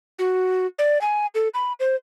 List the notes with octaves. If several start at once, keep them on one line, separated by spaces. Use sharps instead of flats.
F#4
D5
G#5
A4
B5
C5